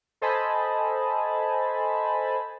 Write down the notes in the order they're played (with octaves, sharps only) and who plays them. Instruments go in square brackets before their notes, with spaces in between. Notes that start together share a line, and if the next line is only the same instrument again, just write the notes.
[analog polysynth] A4 C5 D#5 G#5 A5 B5